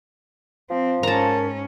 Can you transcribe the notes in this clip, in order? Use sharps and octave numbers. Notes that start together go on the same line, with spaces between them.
F3 C4
G#2 C#4 A#4 A5 A#5